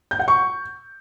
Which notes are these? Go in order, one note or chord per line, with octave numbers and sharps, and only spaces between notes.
G6
F#5
C#6